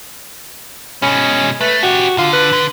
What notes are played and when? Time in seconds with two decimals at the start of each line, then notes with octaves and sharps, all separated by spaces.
1.02 B2 G#3 C#4
1.61 A3 B4
1.83 C#4 F#4 G4
2.18 D3 F4
2.33 B4
2.53 D3